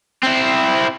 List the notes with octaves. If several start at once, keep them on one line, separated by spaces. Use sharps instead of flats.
C4 E4